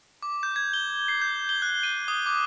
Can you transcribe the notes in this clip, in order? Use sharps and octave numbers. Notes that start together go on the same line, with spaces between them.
D6
G6
G#6
G7
C7
G6
G7
F#6
D#7
D#6
D6